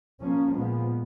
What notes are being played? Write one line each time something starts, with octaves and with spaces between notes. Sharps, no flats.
F3 A#3 C#4
A#2 F3 G#3 B3